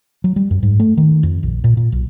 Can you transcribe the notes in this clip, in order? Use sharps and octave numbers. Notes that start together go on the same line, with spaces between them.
F#3
G3
F#2
G#2
A3
D#3
F2
A#1
A#2
A#2
B1